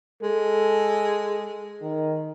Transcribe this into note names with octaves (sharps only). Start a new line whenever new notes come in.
G#3 A4
D#3